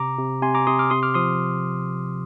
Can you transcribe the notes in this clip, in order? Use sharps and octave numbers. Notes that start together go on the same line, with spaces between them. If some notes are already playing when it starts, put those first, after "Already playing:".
Already playing: C3 A#5 D6
C3
C3 G#5 C6
A#5 D6
C3 C6 D#6
D6 F6
C3 C6 D#6
D6 F6
F3 C6 D#6